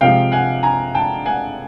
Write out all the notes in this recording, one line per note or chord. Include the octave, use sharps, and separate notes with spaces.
C3 F3 G#3 F5 G5
F#5 G#5
G#5 A#5
G5 A5
F#5 G#5